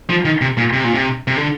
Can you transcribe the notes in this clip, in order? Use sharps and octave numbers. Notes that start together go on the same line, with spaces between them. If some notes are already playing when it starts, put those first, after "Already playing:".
F3
D#3
C3
A#2
C3
A#2
C3
C3
D3